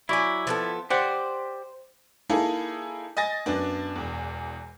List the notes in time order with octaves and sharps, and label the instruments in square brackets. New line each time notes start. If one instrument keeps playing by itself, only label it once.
[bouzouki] F#3 G#5 [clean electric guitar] E4 D5
[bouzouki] F3 B3 A4
[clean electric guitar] G4 D5 F#5 [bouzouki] C5
[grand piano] A#3 D#4 E4 G#4 A4
D#5 G#5 A6 A#6
F#2 B3 D4
E1 E2